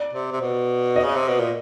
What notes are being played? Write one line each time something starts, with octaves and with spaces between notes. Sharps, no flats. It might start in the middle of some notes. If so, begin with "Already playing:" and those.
Already playing: D5
C3
C3
B2
D#5
C#3
C3
B2
A#2